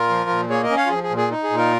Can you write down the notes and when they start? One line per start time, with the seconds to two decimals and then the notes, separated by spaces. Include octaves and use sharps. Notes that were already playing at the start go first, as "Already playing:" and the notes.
Already playing: A#2 F4 A#4
0.10 F3
0.30 A#2
0.50 A#3 G#4 C#5
0.63 A#4 D#5
0.70 C#4
0.77 C#5 F5
0.86 F4
0.90 F3 G#4
1.03 G#4
1.10 A#2
1.17 G#4
1.31 D#4
1.44 G#4
1.50 A#2
1.57 F4 A#4